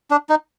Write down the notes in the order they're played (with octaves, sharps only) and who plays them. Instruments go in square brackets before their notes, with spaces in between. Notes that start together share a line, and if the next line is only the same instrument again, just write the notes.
[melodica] D4
D#4